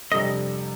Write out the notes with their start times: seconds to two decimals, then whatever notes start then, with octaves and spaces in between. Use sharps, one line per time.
0.12 F2 C3 G3 D4 A4 D#5